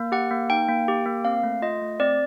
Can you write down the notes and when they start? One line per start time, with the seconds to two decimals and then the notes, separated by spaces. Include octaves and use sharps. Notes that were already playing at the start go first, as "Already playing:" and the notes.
Already playing: A#3
0.12 G4 F#5
0.31 A#3
0.50 D#4 G5
0.69 A#3
0.88 G4
1.06 A#3
1.25 C4 F5
1.43 A3
1.62 F4 D#5
1.81 A3
2.00 C4 D5